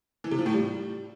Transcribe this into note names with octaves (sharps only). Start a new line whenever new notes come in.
E3
C3
F3
A2
G3